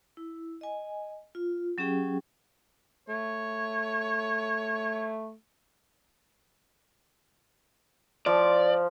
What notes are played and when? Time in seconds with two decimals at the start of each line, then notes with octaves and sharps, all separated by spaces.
0.17 E4
0.61 D#5 G#5
1.35 F4
1.78 F#3 C#4 G4 G#4 G5
3.08 A3 C#5
8.26 F3 D5